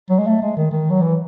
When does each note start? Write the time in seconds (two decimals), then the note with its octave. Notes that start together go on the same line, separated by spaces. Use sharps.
0.10 F#3
0.19 G#3
0.27 A3
0.42 G#3
0.57 D#3
0.71 D#3
0.90 F#3
1.02 E3